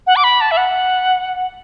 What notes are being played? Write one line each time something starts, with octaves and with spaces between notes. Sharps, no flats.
F#5
D6
B5
A5
E5
F#5